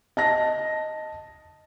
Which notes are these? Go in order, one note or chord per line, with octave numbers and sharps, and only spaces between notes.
D#5 A5 A#6